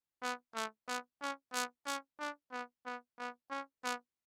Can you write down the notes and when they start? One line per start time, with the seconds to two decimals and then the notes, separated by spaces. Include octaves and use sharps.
0.22 B3
0.55 A3
0.87 B3
1.21 C#4
1.53 B3
1.86 C#4
2.19 D4
2.52 B3
2.86 B3
3.19 B3
3.50 C#4
3.84 B3